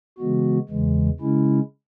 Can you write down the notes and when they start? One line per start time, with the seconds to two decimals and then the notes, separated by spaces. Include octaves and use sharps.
0.18 C#3 E3 G#3 B3 F#4
0.69 E2 C#3 E3 G#3
1.20 C#3 G#3 C#4 E4